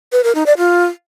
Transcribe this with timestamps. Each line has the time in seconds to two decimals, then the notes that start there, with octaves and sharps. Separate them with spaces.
0.12 B4
0.24 A#4
0.35 D#4
0.46 D5
0.58 F4